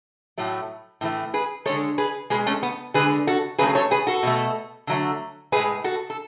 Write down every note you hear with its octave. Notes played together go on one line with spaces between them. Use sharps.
A2 F#3 A3
A2 E3 A3
G#4 B4
D3 G#3 A4 C#5
G#4 B4
B2 G#3 G#4 B4
A3 C#4
B3
D3 G#3 G#4 B4
F#4 A4
C#3 F#3 A3 G#4 B4
A4 C#5
G#4 B4
F#4 A4
B2 A3
D3 F#3 A3
A2 G#3 G#4 B4
F#4 A4
A4